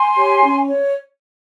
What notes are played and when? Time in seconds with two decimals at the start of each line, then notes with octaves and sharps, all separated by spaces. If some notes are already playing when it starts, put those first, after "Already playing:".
Already playing: G#5 C6
0.16 G4 C#5
0.43 C#4
0.68 C#5